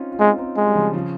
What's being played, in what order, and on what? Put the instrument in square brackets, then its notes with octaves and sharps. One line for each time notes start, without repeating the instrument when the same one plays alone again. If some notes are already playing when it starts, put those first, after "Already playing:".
Already playing: [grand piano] C4 C#4 D#4 F4
F4
[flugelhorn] G#3 [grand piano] C4 D#4
[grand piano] C4 D#4
[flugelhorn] G#3
[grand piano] G3
C#3 F3
C#3 F3